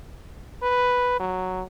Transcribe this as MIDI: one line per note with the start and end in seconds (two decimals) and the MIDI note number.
0.62 1.19 71
1.20 1.63 54